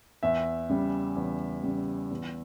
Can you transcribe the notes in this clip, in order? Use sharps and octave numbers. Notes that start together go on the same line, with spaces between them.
E2 E5
C#3 G3
E2
C#3 G3
E2